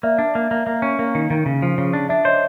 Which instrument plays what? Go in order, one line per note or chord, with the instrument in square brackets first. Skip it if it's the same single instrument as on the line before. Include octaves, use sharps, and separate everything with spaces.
[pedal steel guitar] A#3 [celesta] D5 E5
[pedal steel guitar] D4
A#3
A#3
A#3
C#4
A#3
D#3
D#3
C#3
F3
C#3
D4
[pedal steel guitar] D4 [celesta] D5 E5
[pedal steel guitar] C5 [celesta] C#5 D#5